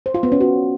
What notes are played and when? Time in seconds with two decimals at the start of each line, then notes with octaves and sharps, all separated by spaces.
0.06 C5
0.14 F4
0.23 B3
0.32 C#4
0.40 F#4